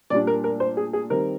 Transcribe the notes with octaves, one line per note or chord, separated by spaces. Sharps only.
A#2 G3 D4 D5
A#4
A#4
C5
G#4
G#4
D#3 G3 C4 A#4